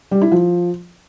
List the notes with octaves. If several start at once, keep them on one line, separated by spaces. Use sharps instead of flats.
G3
E4
F3